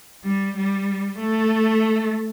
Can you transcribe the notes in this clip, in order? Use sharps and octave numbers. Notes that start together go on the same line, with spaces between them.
G3
G3
A3